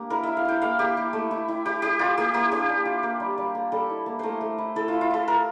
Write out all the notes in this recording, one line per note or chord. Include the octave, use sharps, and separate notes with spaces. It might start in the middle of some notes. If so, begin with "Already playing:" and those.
Already playing: A#3 D4 G4
E4 A#4
E4 E5
F5
E4 G5
A#3 F5
A#3 G4
E4
A3
E4
E4
E4 G4
E4 G4
E4 F4
A#3 G4
A#3 G4
D4 G4
D4
F4
A#3
G3
G3
A#3
G3 A4
E4
A#3
A3 A#4 C5
A3
E4
E4 A4
E4 F4
F4
E4 A4
F4 A#4